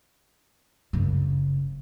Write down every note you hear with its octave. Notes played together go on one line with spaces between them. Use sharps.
F#1 C#3